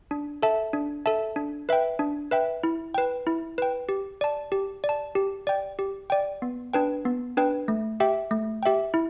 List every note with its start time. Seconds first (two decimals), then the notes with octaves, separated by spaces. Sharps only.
0.11 D4
0.43 A4 E5 A5
0.73 D4
1.06 A4 E5 A5
1.36 D4
1.69 B4 E5 G5
1.99 D4
2.31 B4 E5 G5
2.64 E4
2.94 B4 G5
3.27 E4
3.58 B4 G5
3.89 G4
4.21 D5 A5
4.52 G4
4.84 D5
4.89 A5
5.15 G4
5.47 D5 G5
5.79 G4
6.10 D5 G5
6.42 B3
6.73 D4 B4 G5
7.05 B3
7.37 D4 B4 G5
7.68 A3
8.00 G4 E5 G5
8.31 A3
8.63 G4 E5 G5
8.94 E4